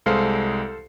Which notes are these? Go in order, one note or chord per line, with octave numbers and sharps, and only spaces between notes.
C2 G#3 A4 C5 F5 C7